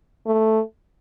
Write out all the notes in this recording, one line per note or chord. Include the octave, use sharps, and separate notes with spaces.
A3